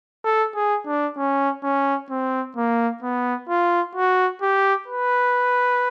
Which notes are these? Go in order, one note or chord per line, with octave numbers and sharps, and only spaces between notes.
A4
G#4
D4
C#4
C#4
C4
A#3
B3
F4
F#4
G4
B4